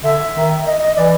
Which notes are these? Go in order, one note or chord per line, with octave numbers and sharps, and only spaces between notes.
D3 E5
D#3
D#5
D#5
E3 D5